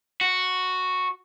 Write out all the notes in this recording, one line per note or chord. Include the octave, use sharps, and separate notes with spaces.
F#4